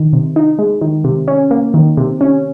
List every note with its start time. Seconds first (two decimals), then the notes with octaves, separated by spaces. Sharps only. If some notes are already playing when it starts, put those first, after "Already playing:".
Already playing: D#3
0.13 C3
0.36 D#4
0.59 G#3
0.81 D#3
1.04 C3
1.28 C#4
1.51 A#3
1.74 D#3
1.97 C3
2.21 C#4